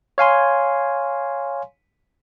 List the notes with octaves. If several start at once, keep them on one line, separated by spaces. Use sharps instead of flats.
C#5 F5 G#5 C6